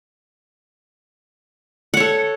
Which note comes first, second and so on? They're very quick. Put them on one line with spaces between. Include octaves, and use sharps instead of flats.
F#5 C#5 A4